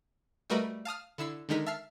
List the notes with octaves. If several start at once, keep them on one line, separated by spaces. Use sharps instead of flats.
G3 A3 F#4 A#4 B4 D#5
F5 A5 D#6 F6
D3 E4 E6 C7
D3 D#3 G#3 D#4 A#4 B6
E5 A5 F6 C7